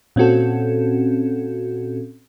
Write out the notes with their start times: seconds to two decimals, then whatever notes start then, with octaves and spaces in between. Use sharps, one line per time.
0.16 A#2 C4 C#4 F#4 A4